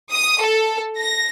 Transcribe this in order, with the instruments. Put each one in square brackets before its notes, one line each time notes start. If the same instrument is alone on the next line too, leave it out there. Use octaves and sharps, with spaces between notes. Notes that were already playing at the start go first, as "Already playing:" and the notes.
[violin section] D#6
A4
A#6